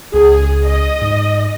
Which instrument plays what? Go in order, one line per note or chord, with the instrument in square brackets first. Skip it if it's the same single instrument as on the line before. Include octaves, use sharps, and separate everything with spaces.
[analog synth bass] C#2 [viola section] G#4
[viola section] D#5
[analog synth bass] G#2